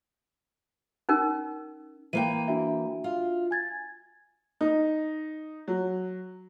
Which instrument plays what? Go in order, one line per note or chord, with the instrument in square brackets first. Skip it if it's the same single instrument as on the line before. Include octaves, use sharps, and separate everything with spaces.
[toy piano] C#4 D#4 A#4
[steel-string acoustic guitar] E3 A#3 G5 [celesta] D#7
[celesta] D4 F#4 E5
[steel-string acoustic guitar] F4
[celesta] G#5 G#6 A6
[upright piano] D#4
F#3